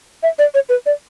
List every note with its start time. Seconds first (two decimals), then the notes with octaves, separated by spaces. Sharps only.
0.23 E5
0.39 D5
0.54 C#5
0.69 B4
0.86 D5